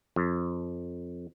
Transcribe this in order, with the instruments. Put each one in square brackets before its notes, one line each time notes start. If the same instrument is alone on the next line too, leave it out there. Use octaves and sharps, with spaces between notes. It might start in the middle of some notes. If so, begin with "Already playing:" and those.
[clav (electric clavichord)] F2